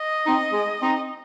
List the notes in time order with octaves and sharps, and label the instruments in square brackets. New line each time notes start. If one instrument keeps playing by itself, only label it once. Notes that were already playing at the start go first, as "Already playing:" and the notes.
Already playing: [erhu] D#5
[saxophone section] C4 D#4
G#3
C4 D#4